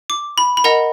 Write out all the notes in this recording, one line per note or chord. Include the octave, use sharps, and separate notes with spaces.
D6
B5
B5
A#4 D#5 F#5 A#5